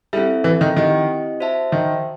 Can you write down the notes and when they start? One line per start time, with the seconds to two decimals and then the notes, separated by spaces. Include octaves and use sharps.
0.13 G3 C4 E4 A4 E5
0.44 E3
0.61 D#3
0.76 D#3 C4 E4 G4 D#5
1.40 F#4 C5 E5 A5
1.72 D#3